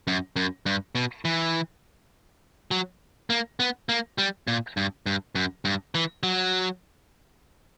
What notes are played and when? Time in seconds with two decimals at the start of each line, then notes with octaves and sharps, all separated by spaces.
0.07 F#2
0.36 F#2
0.66 G2
0.95 B2
1.25 E3
2.71 F#3
3.30 A#3
3.60 B3
3.89 A#3
4.18 G3
4.48 A#2
4.77 G2
5.06 G2
5.35 F#2
5.65 G2
5.95 E3
6.23 F#3